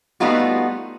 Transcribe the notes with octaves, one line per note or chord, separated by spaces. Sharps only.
G3 A3 B3 D#4 F4 F#4